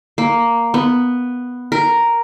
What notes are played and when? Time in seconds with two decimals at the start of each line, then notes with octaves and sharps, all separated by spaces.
0.18 A#3
0.74 B3
1.72 A#4